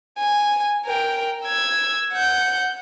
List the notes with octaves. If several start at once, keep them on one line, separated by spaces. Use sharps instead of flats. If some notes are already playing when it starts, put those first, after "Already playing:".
G#5
A#4 G5
E6 G#6
F#5 G6